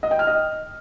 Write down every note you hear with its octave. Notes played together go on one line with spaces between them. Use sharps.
D#5
G5
F6
D#5